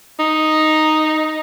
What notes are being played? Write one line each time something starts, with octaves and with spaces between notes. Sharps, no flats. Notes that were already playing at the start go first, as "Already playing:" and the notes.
D#4